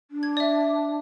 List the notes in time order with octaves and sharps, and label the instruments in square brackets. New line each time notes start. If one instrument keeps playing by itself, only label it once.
[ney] D4
[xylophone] G#6
D5 E5